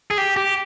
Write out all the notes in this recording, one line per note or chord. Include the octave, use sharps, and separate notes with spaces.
G#4
G4
G4